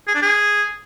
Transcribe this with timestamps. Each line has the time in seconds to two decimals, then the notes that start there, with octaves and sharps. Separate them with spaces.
0.07 G#4
0.15 D4
0.22 G#4